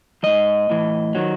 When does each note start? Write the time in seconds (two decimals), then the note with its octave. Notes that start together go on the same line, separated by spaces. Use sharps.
0.23 G#2 F3 D#5
0.70 A2 E3
1.15 D#3 F#3